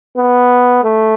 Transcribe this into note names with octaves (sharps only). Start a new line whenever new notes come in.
B3
A3